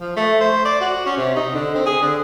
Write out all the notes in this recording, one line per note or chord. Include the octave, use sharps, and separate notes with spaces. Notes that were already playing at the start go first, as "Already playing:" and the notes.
F3
A3
C5
D5
F#4
C#4
C3
D#4
D3
C4
G#4
D3